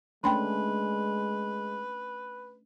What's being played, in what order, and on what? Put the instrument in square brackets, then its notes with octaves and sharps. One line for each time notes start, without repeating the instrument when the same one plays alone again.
[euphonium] G#3 [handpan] A3 C#4 D4 [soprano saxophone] B4 [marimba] G5 B5 C6